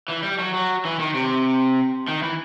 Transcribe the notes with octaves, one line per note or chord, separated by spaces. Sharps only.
E3
G3
F#3
F#3
E3
D#3
C3
D#3
E3